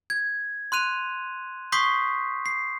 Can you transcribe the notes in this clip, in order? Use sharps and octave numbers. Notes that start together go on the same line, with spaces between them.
G#6
C6 F#6 D#7 F7
C6 C#6 D#6 G6 B6 C7
C7